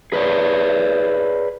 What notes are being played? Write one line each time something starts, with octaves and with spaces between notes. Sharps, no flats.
G#4 B4 C#5 D5